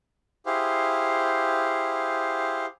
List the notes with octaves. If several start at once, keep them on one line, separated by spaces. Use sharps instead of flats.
E4 G4 G#4 C5 F5